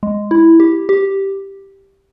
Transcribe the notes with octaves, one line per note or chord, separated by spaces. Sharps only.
G#3
E4
G4
G4